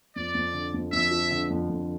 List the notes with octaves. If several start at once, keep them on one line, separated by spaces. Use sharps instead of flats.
F2 D5
F2
D3
F2
F2 E5
F3
D3
F2
F2